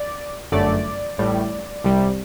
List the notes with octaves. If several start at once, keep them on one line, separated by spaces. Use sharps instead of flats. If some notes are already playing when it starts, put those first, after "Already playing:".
Already playing: D5
G1 F#2 D3 A3 D5
A1 A2 G3
C2 C3 G3